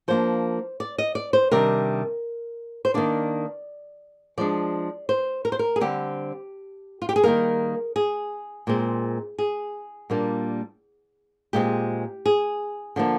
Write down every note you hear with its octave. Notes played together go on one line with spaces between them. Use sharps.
F3 A#3 D4 C5
D5
D#5
D5
C5
C3 D#3 G3 D4 A#4
C5
D#3 A#3 D4 D5
F3 G#3 D4 D5
C5
A#4
C5
A#4
G#4
D3 G3 C4 G4
F4
G4
G#4
D#3 G3 A#3 A#4
G#4
A#2 G#3 C4
G#4
A#2 G3 A#3 D4
A#2 G#3 C4 G4
G#4
D3 F3 A#3 D4